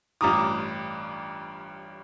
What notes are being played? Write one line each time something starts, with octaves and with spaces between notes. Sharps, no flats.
A1 G2 F4 A#5 D6 D#6